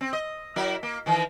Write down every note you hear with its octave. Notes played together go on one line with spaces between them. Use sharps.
C4
D#5
F#3 E4 A#4
A#3
D#3 E3